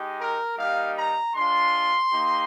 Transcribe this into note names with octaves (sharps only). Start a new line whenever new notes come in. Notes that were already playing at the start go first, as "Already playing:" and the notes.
Already playing: G#3 D#4 G4
A#4
G3 A#3 D#4 G4 F5
A#5
G#3 D4 F4 C6
A#3 D#4 G4